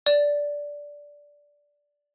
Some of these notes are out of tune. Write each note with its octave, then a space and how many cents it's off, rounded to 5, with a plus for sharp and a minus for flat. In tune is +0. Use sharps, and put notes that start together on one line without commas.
D5 -10